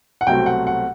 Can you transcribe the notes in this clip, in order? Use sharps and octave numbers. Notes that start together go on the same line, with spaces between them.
F#5
C2 B2 F#3 A3 C4 G5
F#5
F#5